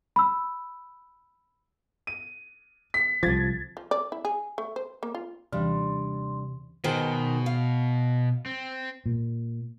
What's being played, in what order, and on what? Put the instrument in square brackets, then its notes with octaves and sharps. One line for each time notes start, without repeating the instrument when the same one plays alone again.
[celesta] B5 E6
[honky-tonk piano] D#7
B6
[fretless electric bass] C2 F3 [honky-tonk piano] G#6 A6
[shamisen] F3
D5
E4
G#4
A3
C5
A#3
F4
[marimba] D#2 E3 [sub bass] C3 [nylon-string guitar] G3 D4 [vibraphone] C6
[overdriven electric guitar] B2 [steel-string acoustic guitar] D#3 G#4 C5
[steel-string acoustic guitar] F5
[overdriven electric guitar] C4
[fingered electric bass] A#2